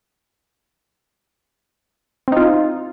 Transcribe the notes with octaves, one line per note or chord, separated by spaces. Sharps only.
C4 D#4 F4